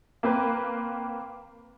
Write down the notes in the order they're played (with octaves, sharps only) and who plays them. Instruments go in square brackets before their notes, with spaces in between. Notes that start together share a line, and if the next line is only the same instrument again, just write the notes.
[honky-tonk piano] A#3 C4 B4